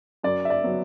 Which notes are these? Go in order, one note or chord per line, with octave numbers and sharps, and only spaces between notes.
F#2 D5
E5
D5
F#3 B3